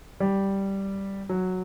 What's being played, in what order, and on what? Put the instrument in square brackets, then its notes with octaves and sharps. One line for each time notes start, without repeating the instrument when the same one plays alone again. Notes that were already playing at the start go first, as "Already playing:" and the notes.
[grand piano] G3
F#3